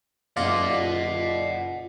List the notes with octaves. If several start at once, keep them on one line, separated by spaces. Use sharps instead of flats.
F#1 F4 D5 D#5 F#5